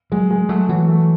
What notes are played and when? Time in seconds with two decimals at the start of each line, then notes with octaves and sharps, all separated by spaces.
0.12 F#3 G#3
0.31 G#3
0.49 F#3 A3
0.69 E3 F#3
0.88 A3